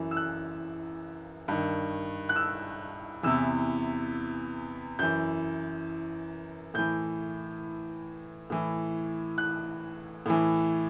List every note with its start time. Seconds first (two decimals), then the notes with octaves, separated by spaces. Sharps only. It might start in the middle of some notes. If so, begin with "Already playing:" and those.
Already playing: F#2 E3
0.11 E6
0.17 F#6
1.48 G2 D#3
2.29 F#6
2.36 E6
3.23 E2 C3 E3 E6
4.99 F#2 E3 G6
6.74 A2 E3 G6
8.50 A2 E3
9.38 F#6
10.26 A2 E3